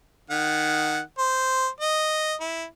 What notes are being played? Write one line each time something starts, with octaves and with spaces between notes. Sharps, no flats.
D#3 F#5
C5
D#5
E4